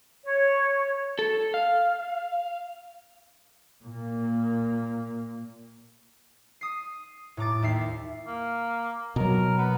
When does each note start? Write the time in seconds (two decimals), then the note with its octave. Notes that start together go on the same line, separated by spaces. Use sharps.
0.25 C#5
1.19 A4
1.54 F5
3.84 A#2 A#3
6.61 D#6 C7
7.37 A2 A#5 D6 A6
7.62 D#2 E5 C7
8.27 A#3
9.16 B2 F#3 A#4
9.58 B3